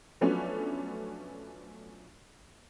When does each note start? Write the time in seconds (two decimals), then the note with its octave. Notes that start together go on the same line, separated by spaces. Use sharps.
0.21 F3 F#3 A3 B3 C#4 D4